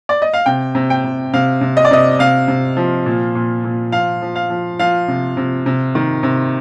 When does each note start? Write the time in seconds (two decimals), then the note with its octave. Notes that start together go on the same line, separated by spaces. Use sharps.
0.09 D5
0.22 D#5
0.33 F5
0.46 C3 G5
0.75 C3
0.90 G5
1.04 C3
1.33 C3 F5
1.61 C3
1.77 D#5
1.85 D5
1.91 C3 D#5
2.19 C3 F5
2.48 C3
2.77 F3
3.06 A#2
3.35 A#2
3.64 A#2
3.92 F3 F5
4.22 F3
4.36 F5
4.50 F3
4.79 F3 F5
5.08 C3
5.37 C3
5.66 C3
5.95 D#3
6.23 C3